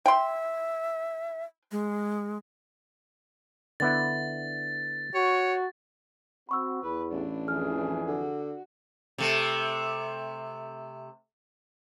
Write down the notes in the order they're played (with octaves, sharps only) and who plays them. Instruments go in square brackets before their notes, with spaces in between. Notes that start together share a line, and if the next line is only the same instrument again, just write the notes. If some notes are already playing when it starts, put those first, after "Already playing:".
[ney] E5 [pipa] G5 C6
[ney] G#3
[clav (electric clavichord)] D3 B3 E4 [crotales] A6
[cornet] F#4 [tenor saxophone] C#5
[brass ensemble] C4 F#4 [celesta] B5 C#6 E6
[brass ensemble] E2 [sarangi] B4
[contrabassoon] A1 [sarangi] D4
[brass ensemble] F2 E3 G#4 [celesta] F6
[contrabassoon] D3 [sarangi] F#4
[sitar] C3 A3